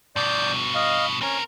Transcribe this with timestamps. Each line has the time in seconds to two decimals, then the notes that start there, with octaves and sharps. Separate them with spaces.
0.16 G2 B2 D5 G6
0.75 D#5 F5
1.22 C4 C#4 A#4